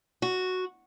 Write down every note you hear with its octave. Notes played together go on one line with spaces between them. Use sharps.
F#4